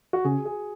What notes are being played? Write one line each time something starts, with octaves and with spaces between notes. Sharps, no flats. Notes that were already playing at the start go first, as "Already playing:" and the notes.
F#4
C#3 G#4
G#4